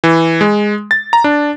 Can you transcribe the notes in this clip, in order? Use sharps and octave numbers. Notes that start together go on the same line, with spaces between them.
E3
G#3
A6
A#5
D4